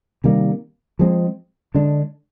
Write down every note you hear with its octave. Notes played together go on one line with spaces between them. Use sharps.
C3 D#3 G3 A#3
F3 G#3 C4
D3 G#3 D4